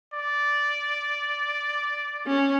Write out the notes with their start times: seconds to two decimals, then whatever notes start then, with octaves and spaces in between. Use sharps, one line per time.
0.14 D5
2.27 C#4